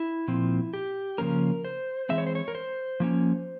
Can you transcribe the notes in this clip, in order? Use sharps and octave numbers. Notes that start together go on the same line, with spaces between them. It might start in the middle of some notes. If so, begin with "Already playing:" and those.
Already playing: E4
A#2 F3 C4
G4
C#3 F3 A#3 C#4 A#4
C5
E3 G#3 C4 E5
C#5
C5
C#5
A#4
C5
F3 A#3 C#4